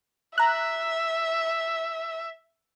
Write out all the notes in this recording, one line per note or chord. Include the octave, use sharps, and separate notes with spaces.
E5 A#5 F#6